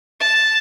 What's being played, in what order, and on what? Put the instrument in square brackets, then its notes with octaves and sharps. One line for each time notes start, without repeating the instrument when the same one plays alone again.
[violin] A5